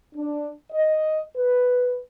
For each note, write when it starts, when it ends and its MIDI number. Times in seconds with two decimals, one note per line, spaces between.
0.16 0.49 62
0.72 1.21 75
1.37 1.99 71